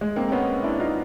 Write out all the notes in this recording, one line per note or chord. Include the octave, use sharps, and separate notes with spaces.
G#3
A#3 C4
C4
B3 C#4
D4 E4
D#4 F4